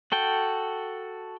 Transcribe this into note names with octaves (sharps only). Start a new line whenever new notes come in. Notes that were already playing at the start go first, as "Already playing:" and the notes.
F#4 A4 G5